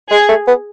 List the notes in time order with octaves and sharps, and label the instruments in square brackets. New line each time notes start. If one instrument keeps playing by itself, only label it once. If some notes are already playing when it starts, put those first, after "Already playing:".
[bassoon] G#3 [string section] G#4
[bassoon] A3
B3